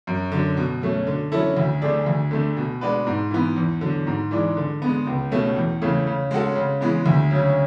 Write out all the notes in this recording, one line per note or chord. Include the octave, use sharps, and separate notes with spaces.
F#2
D3 F#3
B2
F#3 A3 C#4
D3
F#3 C#4 E4 A4
D2
D3 A3 D4 G#4
D2
D3 A3
B2
G#3 D4 F#4 B4
G#2
E3 B3
E2
D3 F#3
G#2
E3 G#3 D4
D3
G#3 B3
C#2
B2 A3 C#4
E2
C#3 E3 A3
C#3
G#3 C#4 F#4 A4
C#3
E3 G#3 B3
D2
C#3 F#3 C#4